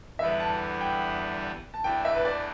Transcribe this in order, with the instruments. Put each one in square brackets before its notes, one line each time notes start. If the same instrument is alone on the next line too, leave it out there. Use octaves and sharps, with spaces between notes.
[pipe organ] E2 D3 G3 B3 E4 [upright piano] E5
[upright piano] A5
G5
A5
[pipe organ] E2 E3 A3 D4 [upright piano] G5
[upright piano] E5
B4
D5